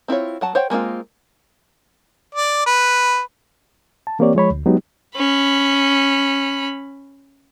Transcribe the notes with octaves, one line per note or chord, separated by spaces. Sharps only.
C4 E4 F4 C#5
F#3 F#5 A5
C5 C#5 F#5 G5
G#3 A#3 C4 F4
D5
B4
A5
E3 A#3 C4 G4 C#5 D5
F3 G#3 C#5 B5
D2
F#3 G#3 B3 D#4 G4
C#4 B5